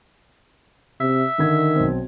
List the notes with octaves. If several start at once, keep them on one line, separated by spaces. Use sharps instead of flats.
C3 E5
D3 D#3 G#6
B1 C4